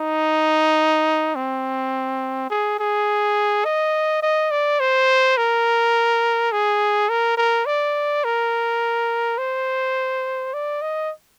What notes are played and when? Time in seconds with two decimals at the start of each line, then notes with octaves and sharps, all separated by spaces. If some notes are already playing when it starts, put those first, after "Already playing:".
Already playing: D#4
1.35 C4
2.50 G#4
2.79 G#4
3.65 D#5
4.22 D#5
4.51 D5
4.80 C5
5.37 A#4
6.52 G#4
7.09 A#4
7.37 A#4
7.66 D5
8.24 A#4
9.38 C5
10.54 D5
10.82 D#5